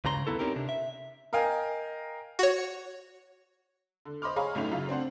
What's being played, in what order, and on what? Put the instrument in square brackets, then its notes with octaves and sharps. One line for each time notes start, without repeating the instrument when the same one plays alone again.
[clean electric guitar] C#2 G2 C#3 A#5 C6
D2 G2 D#3 B3 E4 A4
C4 C#4 D#4 G4 A#4
C3 D4
E5
[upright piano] A#4 D#5 F5 G5 G#5
[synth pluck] F#4 C#5
[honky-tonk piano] D3
C5 D#5 B5 C6 D6 F6
G#4 C#5 D#5 F5 A#5 B5
G1 A2 F#3 C#4 D#4 F7
F#2 C#3 F4
C4 D4 C5 F#5